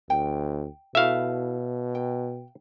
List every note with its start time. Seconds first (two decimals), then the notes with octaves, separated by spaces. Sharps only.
0.10 D2 G5
0.95 B2 E4 F#4 A4 E5 F5
1.95 G5